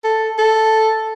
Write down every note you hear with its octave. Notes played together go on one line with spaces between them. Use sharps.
A4
A4